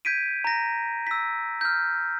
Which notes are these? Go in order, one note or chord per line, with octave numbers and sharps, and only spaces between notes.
G6 G#6 B6 D7 D#7
A#5 A#6
E6 B6
F6 G6